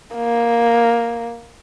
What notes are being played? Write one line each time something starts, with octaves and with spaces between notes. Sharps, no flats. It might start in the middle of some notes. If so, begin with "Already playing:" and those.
A#3